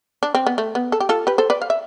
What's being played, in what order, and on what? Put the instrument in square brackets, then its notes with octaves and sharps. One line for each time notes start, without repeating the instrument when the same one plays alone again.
[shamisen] D4
C4
B3
A3
B3
A4
G4
F4 A4
G4 B4
A4 C5
B4 D5
F5
E5